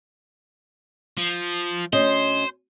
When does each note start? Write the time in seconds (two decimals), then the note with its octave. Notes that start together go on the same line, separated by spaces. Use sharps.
1.17 F3
1.93 D2 C#4 C5 D#5